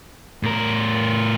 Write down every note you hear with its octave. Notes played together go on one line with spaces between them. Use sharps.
A2 A#4